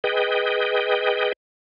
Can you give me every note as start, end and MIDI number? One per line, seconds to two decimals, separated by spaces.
0.04 1.33 68
0.04 1.33 71
0.04 1.33 75
0.04 1.33 79